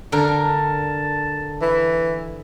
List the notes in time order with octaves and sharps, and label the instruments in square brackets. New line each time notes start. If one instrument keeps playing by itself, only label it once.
[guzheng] D3 A#4 [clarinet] A5
[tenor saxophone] E3